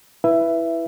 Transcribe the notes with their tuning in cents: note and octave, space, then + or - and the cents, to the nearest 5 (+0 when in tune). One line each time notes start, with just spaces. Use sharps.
E4 +0 B4 +0 E5 +15